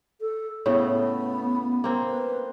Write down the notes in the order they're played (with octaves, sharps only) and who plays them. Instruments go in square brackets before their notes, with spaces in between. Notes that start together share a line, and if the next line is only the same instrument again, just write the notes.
[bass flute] A4
[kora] A2 C#3 A3 [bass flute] B3
[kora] A#3 C4
[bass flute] B4